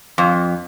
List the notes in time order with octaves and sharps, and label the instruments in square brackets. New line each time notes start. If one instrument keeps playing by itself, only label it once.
[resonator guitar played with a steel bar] F2